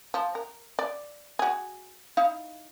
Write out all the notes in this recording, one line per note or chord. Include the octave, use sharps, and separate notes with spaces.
F3
A#4
D5
F#4 G#4
D#4 E4 F5